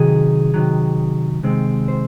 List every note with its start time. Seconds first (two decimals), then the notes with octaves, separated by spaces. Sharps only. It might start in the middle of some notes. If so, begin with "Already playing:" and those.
Already playing: C3 D#3 F#3 G#4
0.54 C3 D#3 F#3
1.43 C3 D#3 G#3 C4
1.88 C5